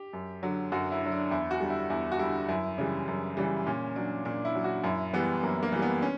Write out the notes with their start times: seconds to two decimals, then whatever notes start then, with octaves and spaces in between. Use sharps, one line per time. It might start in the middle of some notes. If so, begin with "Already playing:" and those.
Already playing: G4
0.13 F#2
0.43 D3 F#3
0.72 F#2 F#4
0.92 E4
1.02 D3 F#3
1.12 D4
1.31 E2 E4
1.51 F#4
1.60 D3 G3
1.70 E4
1.90 E2 E4
2.12 F#4
2.19 D3 G3 E4
2.49 F#2 E4
2.78 C#3 E3 G3
3.08 F#2
3.37 C#3 E3 G3
3.66 A#2 C#4
3.96 F#3 D4
4.25 A#2 D4
4.45 E4
4.55 F#3
4.64 F#4
4.84 F#2 E4
5.13 E3 G3 B3
5.43 F#2 A#3
5.63 A#3
5.72 E3 G3
5.82 B3
6.02 C#4